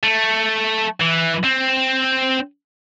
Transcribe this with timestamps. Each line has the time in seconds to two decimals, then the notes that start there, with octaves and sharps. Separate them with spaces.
0.03 A3
1.00 E3
1.44 C4